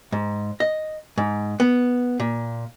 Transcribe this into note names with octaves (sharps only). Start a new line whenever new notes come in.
G#2
D#5
G#2
B3
A#2